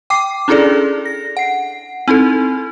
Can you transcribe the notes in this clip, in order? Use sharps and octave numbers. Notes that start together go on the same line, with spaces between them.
G5 D6 C7
C#4 D4 E4 G#4 A4 D5
A#6
F#5 C7
C4 D#4 E4 A4